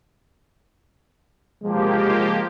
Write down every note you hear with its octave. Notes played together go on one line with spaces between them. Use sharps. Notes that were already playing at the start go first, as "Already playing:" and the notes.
F3 G#3 A#3 G4